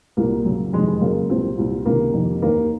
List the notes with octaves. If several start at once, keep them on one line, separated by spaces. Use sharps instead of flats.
C2 A#2 A#3
F#2 C#3
F2 C3 D#3 G#3
G#3
F#2 C#3 A#3
C2 A#2 C4
C2 A#2
C#2 C3 D#3 A#3
F2 C3 D#3
D#2 D#3 A#3